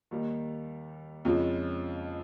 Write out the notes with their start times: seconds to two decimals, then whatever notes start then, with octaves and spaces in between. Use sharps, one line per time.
0.11 D#2 D#3 G3
1.25 F2 C#3 F3 G#3